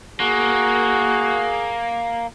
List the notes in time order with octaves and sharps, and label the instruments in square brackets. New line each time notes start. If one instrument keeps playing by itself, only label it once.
[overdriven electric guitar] A#3 [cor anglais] F#4 [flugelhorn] G#4